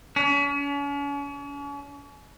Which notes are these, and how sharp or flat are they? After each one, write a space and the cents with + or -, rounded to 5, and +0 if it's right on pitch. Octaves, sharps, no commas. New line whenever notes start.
C#4 +40